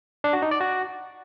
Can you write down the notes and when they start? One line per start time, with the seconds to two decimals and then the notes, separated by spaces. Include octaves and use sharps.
0.24 D4
0.33 F#4
0.42 D#4
0.51 D5
0.60 F#4